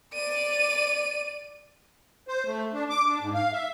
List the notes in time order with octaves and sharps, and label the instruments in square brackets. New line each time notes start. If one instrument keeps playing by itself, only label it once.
[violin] D5 D#7
[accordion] C5
A3
D4
D6
D4
G#2
F5
E5